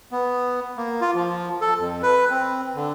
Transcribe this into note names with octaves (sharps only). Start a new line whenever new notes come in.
B3
A#3
F4
F3
A4
F2
B4
C4
D3